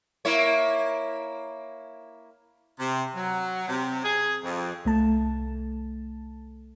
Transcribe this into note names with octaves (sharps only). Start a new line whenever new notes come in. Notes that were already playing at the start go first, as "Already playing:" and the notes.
A#3 E4 C#5
C3
F#3
C3
G#4
F2
C2 A3 A5